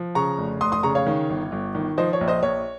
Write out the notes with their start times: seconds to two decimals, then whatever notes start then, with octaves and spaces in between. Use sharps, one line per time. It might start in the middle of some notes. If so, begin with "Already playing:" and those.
Already playing: F3
0.15 C#3 A#5 C#6
0.38 F1
0.61 F1 C6 D#6
0.72 C6 D#6
0.83 C#3 A#5 C#6
0.95 C#5 F5
1.06 D#3
1.30 G1
1.52 G1
1.75 D#3
1.98 F3 C5 D#5
2.13 C#5
2.21 A#1
2.28 C5 D#5
2.43 A#1 C#5